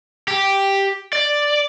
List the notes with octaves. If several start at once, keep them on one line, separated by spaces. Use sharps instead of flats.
G4
D5